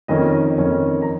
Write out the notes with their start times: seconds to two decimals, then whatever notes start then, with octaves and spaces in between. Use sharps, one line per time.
0.08 F2 D#3 A#3 C#4 D#5
0.57 F2 D#3 A#3 C#4
1.02 A#5